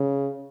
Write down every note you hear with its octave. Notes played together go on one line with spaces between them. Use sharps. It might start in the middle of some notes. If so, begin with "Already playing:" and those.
Already playing: C#3